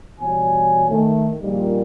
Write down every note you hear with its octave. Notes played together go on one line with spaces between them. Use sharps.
B2 E3 G3 C#5 G#5
D#3 A3
A#1 A#2 D#3 G3